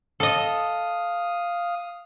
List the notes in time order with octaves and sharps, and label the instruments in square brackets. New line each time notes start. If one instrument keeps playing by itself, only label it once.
[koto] A4 D#5 [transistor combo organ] F5 D#6